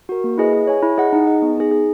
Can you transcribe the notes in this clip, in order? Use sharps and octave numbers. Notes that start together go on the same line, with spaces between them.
F#4 A#4
A#3
E4 G#4 B4 D#5
G#4
C#5 G#5
E4
G#4 D#5 F#5
D#4
G#4 D#5
B3
D#4 G#4
G#4